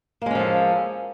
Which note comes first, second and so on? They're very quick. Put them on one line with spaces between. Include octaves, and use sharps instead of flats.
A#3 G#3 C#4 F3 A4